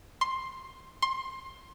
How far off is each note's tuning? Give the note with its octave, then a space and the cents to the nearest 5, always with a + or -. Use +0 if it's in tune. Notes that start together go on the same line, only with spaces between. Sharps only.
C6 +10
C6 +20